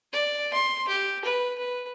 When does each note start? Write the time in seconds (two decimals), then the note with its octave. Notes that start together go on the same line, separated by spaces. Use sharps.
0.12 D5
0.53 C6
0.88 G4
1.24 B4
1.58 B4